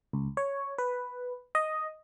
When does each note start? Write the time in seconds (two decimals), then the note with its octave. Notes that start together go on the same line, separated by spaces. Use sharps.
0.13 C#2
0.37 C#5
0.78 B4
1.55 D#5